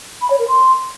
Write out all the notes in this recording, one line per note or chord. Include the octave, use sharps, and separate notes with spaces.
B5
C#5
A#4
C6